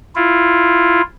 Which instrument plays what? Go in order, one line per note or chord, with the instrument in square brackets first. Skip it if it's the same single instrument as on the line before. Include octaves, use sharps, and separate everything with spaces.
[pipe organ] E4 F4